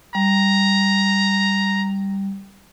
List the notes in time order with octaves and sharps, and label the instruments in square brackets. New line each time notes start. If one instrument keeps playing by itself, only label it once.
[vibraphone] G3 [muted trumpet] A#5